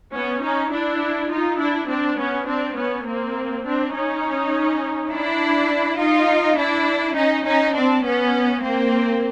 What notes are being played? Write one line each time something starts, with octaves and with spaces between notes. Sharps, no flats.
B3 C#4
C#4 D#4
D4 E4
D#4 F4
D4 E4
C4 D4
B3 C#4
C4 D4
B3 C#4
A#3 C4
C4 D4
C#4 D#4
D4 E4
D#4 F4
D4 E4
C#4 D#4
C#4 D#4
C4 D4
B3 C#4
A#3 C4